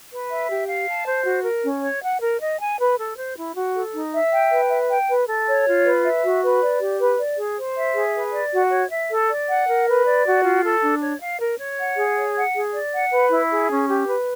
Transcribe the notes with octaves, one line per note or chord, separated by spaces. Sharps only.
B4
E5
G4
F5
A5
C5
F#4
A#4
C#4
C#5
F#5
A#4
D#5
G#5
B4
A4
C5
E4
F#4
A4
D#4
E5
G5
B4
E5
G5
B4
A4
C#5
F4
B4
E5
F#4
B4
D5
G4
B4
D5
G#4
C5
E5
G#4
B4
D5
F#4
C#5
E5
A4
D5
F#5
A#4
B4
D5
F#4
F4
A4
D4
C#5
F5
A#4
C#5
F#5
G#4
C#5
F#5
G#4
D5
F#5
B4
E4
G#4
C#4
G4
B4